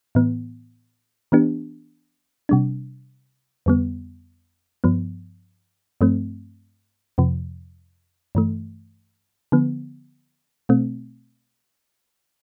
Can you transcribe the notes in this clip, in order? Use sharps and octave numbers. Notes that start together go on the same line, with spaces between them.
A2 E3 B3
E3 B3 D4 G4
C3 G3 D4
F2 D3 G3 B3
G2 F3 B3
G2 F3 A3 C4
F2 C3 F3
G2 E3 A3
D3 F3 B3
B2 A3 C4